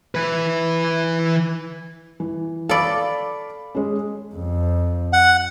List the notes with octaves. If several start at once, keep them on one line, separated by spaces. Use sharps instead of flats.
E3 B4
E3
A4 D5 F5 B5 D6
G#3 C#4
F2
F#5